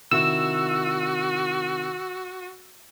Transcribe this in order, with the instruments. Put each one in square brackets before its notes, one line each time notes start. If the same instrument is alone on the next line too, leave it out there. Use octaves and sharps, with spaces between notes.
[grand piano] C3 D#3 E4 [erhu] F#4 [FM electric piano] E6